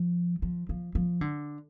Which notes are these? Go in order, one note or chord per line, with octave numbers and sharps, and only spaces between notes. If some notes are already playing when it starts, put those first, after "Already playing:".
Already playing: F3
F3
F3
F3
D3